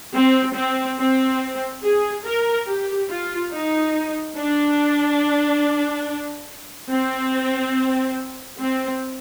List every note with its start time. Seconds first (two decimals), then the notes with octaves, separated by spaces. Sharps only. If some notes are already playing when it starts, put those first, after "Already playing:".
0.14 C4
0.56 C4
0.99 C4
1.83 G#4
2.25 A#4
2.67 G4
3.09 F4
3.52 D#4
4.37 D4
6.89 C4
8.59 C4